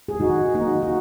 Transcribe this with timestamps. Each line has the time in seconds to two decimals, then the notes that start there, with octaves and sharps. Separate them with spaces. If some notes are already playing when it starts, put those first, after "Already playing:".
0.08 G#4
0.20 D#3 D#4 F#4
0.54 A#3 D#4 F#4
0.82 F#4